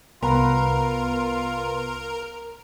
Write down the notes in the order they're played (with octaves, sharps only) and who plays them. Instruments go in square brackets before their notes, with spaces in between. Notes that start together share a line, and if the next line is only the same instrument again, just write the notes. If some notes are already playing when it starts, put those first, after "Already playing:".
[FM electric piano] C2 B3 B4 [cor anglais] F4 [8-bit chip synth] A#4 [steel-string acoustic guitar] A#5